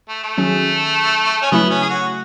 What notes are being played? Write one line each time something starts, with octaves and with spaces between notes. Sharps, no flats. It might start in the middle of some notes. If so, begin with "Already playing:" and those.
A3
A3
D#3 F#3 C#4 G#4
C#4
C#3 F#3 A3 B3 E4
C#4
G#4
F#4